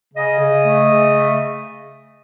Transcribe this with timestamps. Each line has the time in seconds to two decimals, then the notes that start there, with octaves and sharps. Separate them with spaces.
0.14 C#3 D#5
0.39 C#3
0.64 A3
0.88 C#3
1.13 A3